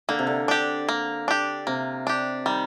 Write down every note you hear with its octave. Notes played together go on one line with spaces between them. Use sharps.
D3 A#3
C3
D3
D4 G4
A#3
D4 G4
C3 A#3
D4 G4
D#3 G3